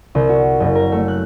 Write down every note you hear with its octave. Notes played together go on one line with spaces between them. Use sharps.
C2
F#4
F#1
A#4
A3
F#6